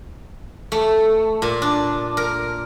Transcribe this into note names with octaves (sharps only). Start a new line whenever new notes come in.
A3
A#2
D4
A#4